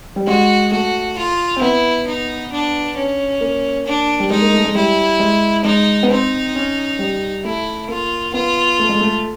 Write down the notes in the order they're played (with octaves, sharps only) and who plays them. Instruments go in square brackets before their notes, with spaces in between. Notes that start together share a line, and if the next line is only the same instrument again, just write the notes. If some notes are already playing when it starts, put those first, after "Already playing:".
[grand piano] G3
[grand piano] G#3 [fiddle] F#4
[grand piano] A3 [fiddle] F#4
[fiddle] F4
[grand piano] C4
[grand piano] B3 [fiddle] E4
[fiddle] D#4
D4
C#4
[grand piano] A#3
[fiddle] D4
[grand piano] G3
[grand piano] G#3 [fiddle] D#4
[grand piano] A#3
A3
G#3
[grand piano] G3 [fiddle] E4
[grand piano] G#3
[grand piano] G#3 [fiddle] D#4
[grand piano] B3
[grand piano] C4 [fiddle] D#4
[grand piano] C#4
G3
[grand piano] A3 [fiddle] E4
[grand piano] A#3 [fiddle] F4
[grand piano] B3 [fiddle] F4
[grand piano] A3
G#3
A3